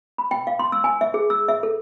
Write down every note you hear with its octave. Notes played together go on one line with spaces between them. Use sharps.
B5
G5
F5
C6
E6
G#5
E5
G#4
E6
E5
A4